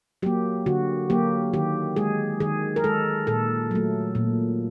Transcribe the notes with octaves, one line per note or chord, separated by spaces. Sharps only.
F#3 A#3 G4
D3 F#4
F#3 A#3 G4
D#3 G4
G#3 G#4
D#3 G#4
A#4
G#3 A4
A#2 A4
F#3 A3
A#2